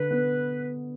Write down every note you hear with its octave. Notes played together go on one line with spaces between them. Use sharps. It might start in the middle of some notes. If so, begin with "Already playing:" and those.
Already playing: D3 B4
B3